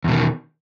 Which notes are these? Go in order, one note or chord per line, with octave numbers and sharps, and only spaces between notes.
E2 B2 D#3